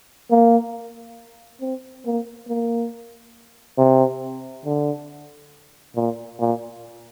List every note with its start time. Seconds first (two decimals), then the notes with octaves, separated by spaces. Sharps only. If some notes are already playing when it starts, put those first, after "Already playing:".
0.30 A#3
1.61 C4
2.05 A#3
2.47 A#3
3.78 C3
4.65 D3
5.95 A#2
6.39 A#2